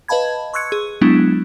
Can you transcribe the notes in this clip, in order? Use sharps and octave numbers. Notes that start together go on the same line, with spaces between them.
B4 D#5 F5 A5 B5 G#6
C6 C#6 E6 F#6 G#6 C#7
G#4
F#3 G#3 B3 D4 E4